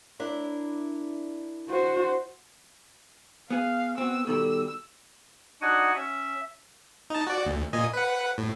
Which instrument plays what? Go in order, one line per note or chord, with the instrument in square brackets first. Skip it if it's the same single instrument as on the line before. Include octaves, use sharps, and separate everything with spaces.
[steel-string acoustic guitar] D4 E4 A#4
[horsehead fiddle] F#4 C5
[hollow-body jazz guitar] B3 G#4 [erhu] F5
[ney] B3 [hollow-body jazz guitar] C4 F#4 [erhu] E6
[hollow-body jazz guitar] B2 D#3 G3 [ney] A4 [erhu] E6
[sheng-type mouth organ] D4 D#4 [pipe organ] F#4 F#5 G#5
[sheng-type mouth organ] C#4 [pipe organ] E5
[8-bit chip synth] D#4 A5
F#4 D5
D2
A#2 D#5 G#5
B4 F#5
A2